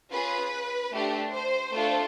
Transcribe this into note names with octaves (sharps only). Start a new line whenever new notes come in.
C#4 F4 G#4 B4
A3 D4 G4
C5
A3 D4 F4 A4